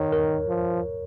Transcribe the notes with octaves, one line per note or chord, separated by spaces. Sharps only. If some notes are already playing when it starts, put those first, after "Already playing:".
Already playing: D#3 C#5
A#4
F3